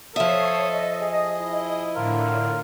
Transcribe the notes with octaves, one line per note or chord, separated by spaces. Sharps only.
F3 A4 C#5 E5 D#6 C7
D#5
G#4
E4
A2 D3 F4 A#4